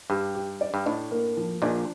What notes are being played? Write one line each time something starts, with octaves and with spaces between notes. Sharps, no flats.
G2 G4
G4
D5
G2
A2 D4
A#3
F3
A#1 A#2 D4